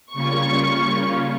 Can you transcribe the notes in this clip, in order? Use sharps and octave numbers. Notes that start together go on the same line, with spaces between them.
C#3 G3 A#3 C#4 F4 C#6